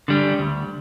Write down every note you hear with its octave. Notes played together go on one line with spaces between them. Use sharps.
D3 G3
D2